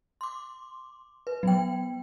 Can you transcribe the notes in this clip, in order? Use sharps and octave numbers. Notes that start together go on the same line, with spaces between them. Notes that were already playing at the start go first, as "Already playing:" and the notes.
C6 D6
B4
F#3 B3 G5